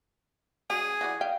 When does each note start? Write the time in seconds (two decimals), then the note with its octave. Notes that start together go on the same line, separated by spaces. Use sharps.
0.70 F#3 C#4 G#4
1.01 E3 F#4 D5
1.21 E5 F5 G5